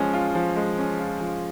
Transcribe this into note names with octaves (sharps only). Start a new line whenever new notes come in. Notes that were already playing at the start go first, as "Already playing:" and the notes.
Already playing: F3 G#3 C#4
F4
F3
G#3
C#4
F4
F3